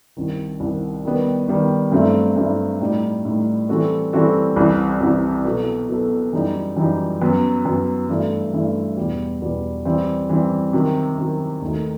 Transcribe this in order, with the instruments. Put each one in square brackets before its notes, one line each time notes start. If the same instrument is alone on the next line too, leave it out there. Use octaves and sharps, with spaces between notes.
[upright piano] C2 C3 D#3
C2 C3 D#3
D#3 G3 B3
D#3 G3 B3
G2 F#3 A3 C4 E4
G2 F#3 A3 C4 E4
A2 G3 D#4
A2 G3 D#4
E3 G3 C4 F#4 A4
E3 G3 C4 F#4 A4
C2 C3 E3
C2 C3 E3
B2 F#3 B3 F#4 A4
B2 F#3 B3 F#4 A4
F#2 E3 G3 D#4
F#2 E3 G3 D#4
F#2 F#3 B3
F#2 F#3 B3
G2 E3 A3 E4
G2 E3 A3 E4
E2 B2 G3
E2 B2 G3
E3 G3 C4
E3 G3 C4
C3 D#3 F#3
C3 D#3 F#3
D#2 D#3 A3 D#4